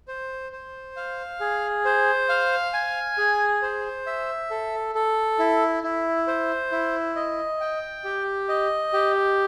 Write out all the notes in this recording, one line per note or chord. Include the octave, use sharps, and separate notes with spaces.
C5
C5
F5
G#4
C5
F5
G#5
G#4
C5
E5
A4
A4
E4
E4
C5
E4
D#5
G5
G4
D#5
G4